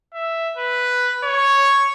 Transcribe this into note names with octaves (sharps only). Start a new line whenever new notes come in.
E5
B4
C#5